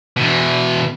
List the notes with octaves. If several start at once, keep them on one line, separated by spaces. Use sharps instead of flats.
B2 E3